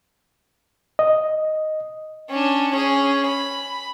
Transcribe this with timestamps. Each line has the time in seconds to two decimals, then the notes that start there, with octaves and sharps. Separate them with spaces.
0.99 D#5
2.29 C#4 D4
2.71 C#4 G#4
3.27 B5